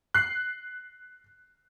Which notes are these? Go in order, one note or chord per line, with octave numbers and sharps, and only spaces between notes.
F#6 C7